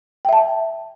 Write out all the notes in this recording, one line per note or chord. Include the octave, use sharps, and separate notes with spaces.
E5 G5 A5